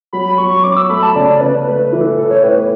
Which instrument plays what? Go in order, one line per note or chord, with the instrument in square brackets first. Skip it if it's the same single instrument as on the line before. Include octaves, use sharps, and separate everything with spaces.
[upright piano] F#3 [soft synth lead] B5
[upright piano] F#3 [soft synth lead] C#6
[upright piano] C#4 [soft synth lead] D6
[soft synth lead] E6
[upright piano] A3 [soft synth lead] B5
[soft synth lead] A5
[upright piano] C#3 [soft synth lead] D5
[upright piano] C#3 [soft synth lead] B4
[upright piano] A3 [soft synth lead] B4
[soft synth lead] B4
[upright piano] E3
[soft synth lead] A4
[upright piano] A2 [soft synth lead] A4
[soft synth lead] C#5
[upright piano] A2 [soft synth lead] B4